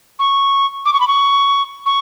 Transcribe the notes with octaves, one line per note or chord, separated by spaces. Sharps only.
C#6
D6
C#6
B5
C#6
C#6